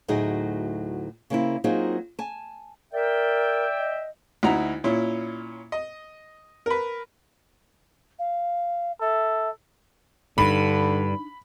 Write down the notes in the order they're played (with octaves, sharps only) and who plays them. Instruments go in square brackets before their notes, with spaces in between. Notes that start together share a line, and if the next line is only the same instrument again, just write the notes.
[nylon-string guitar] D2 A2 F#3 D#4 G#4
C#3 A#3 C4 E4
F#3 A#3 C4 D#4 F4 G#4
G#5 A5
[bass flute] A#4 [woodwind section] D5 E5 G5
[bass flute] D#5
[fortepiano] D2 D#4 E4 F#4 A#5
A#2 C#4 E4 F4
D#5
A#4 B4
[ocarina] F5
[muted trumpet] A4 [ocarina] E5
[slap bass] G2 [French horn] D3 [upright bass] D4 D#4 [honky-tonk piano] B5